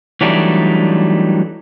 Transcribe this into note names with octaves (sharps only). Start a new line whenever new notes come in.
E3 F#3 G3 A3 D4 D#4